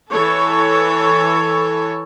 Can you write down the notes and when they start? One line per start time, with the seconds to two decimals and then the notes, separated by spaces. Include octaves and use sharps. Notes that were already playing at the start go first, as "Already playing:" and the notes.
0.12 E3 A4 C#5